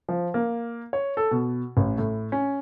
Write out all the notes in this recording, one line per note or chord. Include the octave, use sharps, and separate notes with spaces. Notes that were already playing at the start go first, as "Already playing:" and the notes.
F3
A#3
C#5
A4
B2
A1
A2
C#4